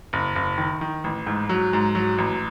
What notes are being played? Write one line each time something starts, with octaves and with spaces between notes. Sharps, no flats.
F#1
F#1
D#3
D#3
A1
G#2
F#3
G#2
F#3
A1